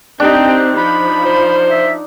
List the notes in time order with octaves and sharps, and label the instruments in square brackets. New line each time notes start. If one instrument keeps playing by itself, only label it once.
[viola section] C4 G4 [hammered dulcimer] D4 D#4 [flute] G5
[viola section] F3 [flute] B5
[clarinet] C5
[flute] E5